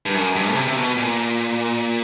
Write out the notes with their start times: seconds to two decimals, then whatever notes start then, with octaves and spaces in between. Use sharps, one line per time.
0.06 G2
0.15 F#2
0.36 G2
0.52 C#3
0.56 C3
0.67 C3
0.77 B2
0.97 A#2